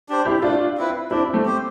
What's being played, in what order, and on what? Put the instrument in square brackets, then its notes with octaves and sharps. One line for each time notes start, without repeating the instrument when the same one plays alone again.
[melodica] D4 G4 C5
[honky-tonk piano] E4 G4
[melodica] A3 [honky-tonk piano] D4 F4
[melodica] C4 E4 B4
[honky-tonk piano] C4 E4 [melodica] D4
[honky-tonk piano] A3 C4
[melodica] G4 C5